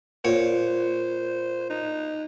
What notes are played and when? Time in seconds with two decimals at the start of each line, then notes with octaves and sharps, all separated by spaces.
0.25 A#2 C5 C#5
1.70 D#4